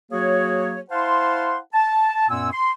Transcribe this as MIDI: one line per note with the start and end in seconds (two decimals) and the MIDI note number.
0.11 0.79 54
0.11 0.79 58
0.11 0.79 66
0.11 0.79 68
0.11 0.79 73
0.91 1.57 64
0.91 1.57 72
0.91 1.57 77
0.91 1.57 78
0.91 1.57 81
0.91 1.57 84
1.74 2.29 81
2.30 2.50 42
2.30 2.50 46
2.30 2.50 59
2.30 2.50 65
2.30 2.50 80
2.30 2.50 88
2.52 2.71 84